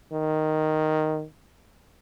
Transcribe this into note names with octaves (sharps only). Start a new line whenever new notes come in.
D#3